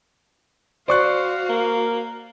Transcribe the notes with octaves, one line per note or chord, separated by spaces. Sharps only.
F#4 C5 D5 F5 C#6 F#6
A#3